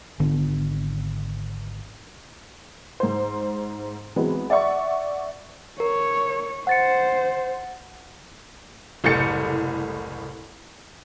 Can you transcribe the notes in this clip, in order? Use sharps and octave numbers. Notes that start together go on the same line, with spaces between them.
G#1 D3 B3
G#2 C5
E3 F#3 G#3 B3 C4
D5 E5 F#5 C#6
A#4 C#5
C5 F#5 A6 C#7
F#1 C2 A2 G6 A6 C#7